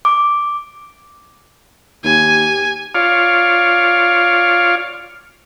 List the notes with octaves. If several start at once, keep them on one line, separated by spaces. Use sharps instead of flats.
D6
D#2 G4 G#5
F4 C#5 D5 F5